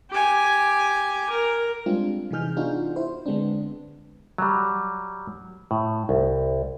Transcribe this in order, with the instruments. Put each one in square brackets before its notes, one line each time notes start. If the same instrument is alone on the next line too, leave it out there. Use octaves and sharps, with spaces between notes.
[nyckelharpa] G4 G#5
A#4
[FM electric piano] G3 G#3 C4 D4 F4
C3 E3 D#4 G#4 F6 G6
B3 D4 D#4 F4 F#4 G#4
E4 C5
D3 G#3 B3 C4 D4
[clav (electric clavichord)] F#3 G3
A2
C2